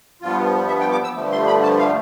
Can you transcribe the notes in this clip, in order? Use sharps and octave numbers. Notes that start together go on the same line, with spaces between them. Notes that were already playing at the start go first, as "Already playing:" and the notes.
G2 F3 B3 F4
E5
G5
D6
E6
G2 D3 F3 A3
C6
B5
A5
F5